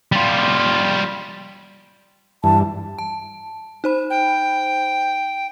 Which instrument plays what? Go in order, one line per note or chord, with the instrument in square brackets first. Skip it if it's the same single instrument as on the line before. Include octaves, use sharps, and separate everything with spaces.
[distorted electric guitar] G3 F4
[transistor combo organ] G2 E3 [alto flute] A5
[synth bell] A5
D#4 C5 B5
[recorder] G5